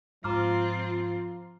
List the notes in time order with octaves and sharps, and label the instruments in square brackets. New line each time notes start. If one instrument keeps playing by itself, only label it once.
[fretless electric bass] G#2 [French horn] F3 [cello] C4 F4 [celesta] A#5 D6 F6